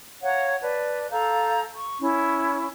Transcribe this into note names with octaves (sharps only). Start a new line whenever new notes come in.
C#5 F5 F#5 A#5
B4 D5 A5
A4 F5 A#5 G6
C#6
C#4 E4